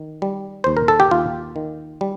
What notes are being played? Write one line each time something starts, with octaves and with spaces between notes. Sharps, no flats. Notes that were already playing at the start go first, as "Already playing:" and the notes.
Already playing: D#3
G3
D#2 C5
A#4
A4
G4
D#2 F4
D#3
G3